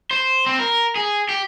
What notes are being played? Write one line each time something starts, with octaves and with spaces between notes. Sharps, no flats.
C5
C4
A#4
G#4
G4